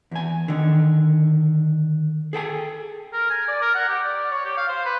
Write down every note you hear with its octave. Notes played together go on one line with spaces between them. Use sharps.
E2 G#5
D3 D#3
G#4 A4 G5 G#5
A#4
G#5
D5
A#4
F#5
G4
D5
C#5
G4
F5
C5
B4